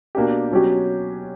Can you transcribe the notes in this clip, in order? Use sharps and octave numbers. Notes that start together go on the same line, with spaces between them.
B2 A#3 D4 G4
B2 F#3 C#4 G4